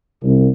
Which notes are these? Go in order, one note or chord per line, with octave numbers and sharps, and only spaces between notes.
C2